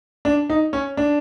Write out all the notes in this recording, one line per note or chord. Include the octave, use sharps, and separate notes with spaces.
D4
D#4
C#4
D4